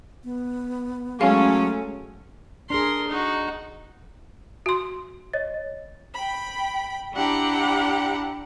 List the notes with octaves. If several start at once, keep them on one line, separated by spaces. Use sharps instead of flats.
B3
F#3 G#3 A3 C#4 A4 F5
D4 G#4 A#4 C6
D#4 F#4
F#4 C6
C#5 D#5 A6
G5 B5
D4 E4 G4 F#5 G5 A#5